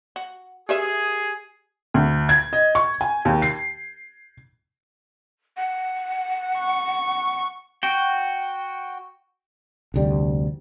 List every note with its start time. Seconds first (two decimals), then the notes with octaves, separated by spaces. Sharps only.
0.16 F#4
0.69 G4 G#4 A#4 B4 E5
1.94 D2
2.29 G#6
2.53 D#5
2.75 C#6
3.01 G#5
3.25 D#2
3.42 C7
5.57 F#5
6.60 C#6
7.83 F#4 G5
9.94 F1 D2 G3